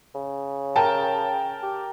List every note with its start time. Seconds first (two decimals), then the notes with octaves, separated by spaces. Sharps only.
0.15 C#3
0.76 A#4 G5 A5
1.63 G4